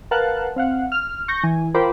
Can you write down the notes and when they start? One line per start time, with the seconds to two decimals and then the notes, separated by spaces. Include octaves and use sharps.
0.11 A#4 B4 F5 F#5 A5 F#6
0.56 C4 F5 F#5
0.92 F6
1.28 C#6 G6 A#6
1.43 E3 G#5
1.74 F4 A#4 C5 G5 B5 D6